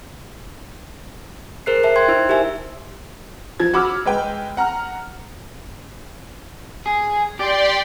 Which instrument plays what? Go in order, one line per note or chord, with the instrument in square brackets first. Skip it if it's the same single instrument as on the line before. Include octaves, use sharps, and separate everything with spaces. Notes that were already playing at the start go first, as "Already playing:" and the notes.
[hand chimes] G#4 A#4 C5 F#6 C7
E5 A5 C7
G5 C6 F#6 G#6
D#4 E4 C5 E6
G4 A#4 C5 E5 G#5
[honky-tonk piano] F3 G#6
F#4 B5 D6 E6 F6
G#3 B4 G5
F#5 A#5 F6
[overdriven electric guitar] G#4
[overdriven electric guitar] G4 [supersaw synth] D5 G5 C6